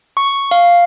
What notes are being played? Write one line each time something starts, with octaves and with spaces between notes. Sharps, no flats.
C#6
F5